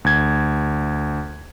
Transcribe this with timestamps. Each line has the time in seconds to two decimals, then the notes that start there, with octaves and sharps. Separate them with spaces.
0.05 D2 G#6